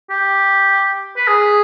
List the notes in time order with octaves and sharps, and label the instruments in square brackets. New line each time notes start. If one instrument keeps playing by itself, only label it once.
[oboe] G4
B4
G#4